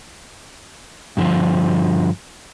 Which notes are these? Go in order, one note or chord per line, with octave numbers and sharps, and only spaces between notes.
G2 D3 D#3 F3